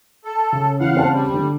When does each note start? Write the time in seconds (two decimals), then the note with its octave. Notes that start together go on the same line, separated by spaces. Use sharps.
0.25 A4
0.53 C#3
0.80 E3 F5 F#5
0.95 C4 C5 A5
1.11 G3
1.34 D3